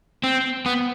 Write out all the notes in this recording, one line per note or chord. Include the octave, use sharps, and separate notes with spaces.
C4
B3